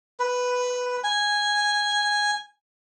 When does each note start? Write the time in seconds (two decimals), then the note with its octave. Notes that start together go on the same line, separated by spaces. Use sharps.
0.20 B4
1.04 G#5